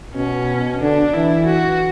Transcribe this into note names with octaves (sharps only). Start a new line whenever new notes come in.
B2 C#4
D3 D4
E3 E4
F#4